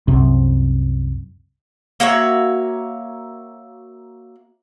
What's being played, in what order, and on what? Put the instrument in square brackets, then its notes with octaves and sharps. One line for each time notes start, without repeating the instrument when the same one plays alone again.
[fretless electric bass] C2 F#2 C3
[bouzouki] A#3 F#4 C#5 E5